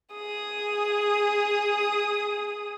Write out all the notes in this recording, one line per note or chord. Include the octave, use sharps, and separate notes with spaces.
G#4 D#6